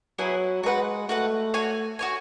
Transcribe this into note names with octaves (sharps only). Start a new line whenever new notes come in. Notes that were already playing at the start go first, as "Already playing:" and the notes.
F#3 B3 E4 G#4
G#3 F#4 B4 F#5
A3 F#4 B4 F#5
F#4 C#5 G#5
F#4 C#5 G#5